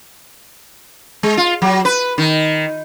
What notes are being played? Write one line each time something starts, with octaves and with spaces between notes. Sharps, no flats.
G#3
F4
F#3
B4
D#3